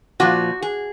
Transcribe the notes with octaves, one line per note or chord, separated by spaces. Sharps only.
A#2 F3 F#4
G#4